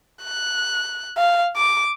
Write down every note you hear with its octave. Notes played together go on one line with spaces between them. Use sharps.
F#6
F5
D6